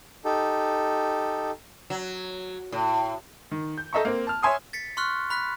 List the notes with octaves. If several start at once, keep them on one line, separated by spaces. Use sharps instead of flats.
D#4 G4 A4
F#3
A2
D#3
G6
A4 D#5 E5 A#5 C#6
A#3 C4
A5 F6
C#5 E5 G#5 C6 D#6
A6 B6 C#7
C6 C#6 F6 F#6
B5 F#6 B6